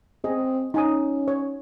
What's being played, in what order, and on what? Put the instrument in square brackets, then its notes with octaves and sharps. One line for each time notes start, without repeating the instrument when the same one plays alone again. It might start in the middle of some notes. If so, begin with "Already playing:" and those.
[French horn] C4 [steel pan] G#4 D#5
[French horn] C#4 [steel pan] D#4 G#5 D#6
[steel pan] C#5